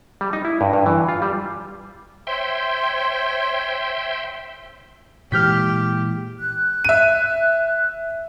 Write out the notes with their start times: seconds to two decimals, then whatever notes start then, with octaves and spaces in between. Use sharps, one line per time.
0.21 G3
0.33 D#4
0.45 E4
0.61 G2
0.73 G2
0.86 E3
1.09 F4
1.22 G3
2.27 C5 C#5 E5 G5 C6
5.32 A#2 E3 G#3 G4 F6 G6 B6
6.39 F#6
6.84 E5 D#7